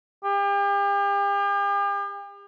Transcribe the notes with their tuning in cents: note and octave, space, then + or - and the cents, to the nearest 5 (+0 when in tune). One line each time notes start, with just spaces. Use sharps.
G4 +40